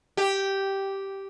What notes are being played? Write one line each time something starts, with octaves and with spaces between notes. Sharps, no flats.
G4